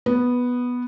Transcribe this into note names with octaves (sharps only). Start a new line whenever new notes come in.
B3